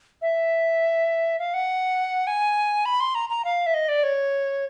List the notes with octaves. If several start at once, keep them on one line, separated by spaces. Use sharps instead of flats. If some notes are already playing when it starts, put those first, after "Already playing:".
E5
F5
F#5
G#5
B5
C6
A#5
A#5
F5
E5
D#5
D5
C#5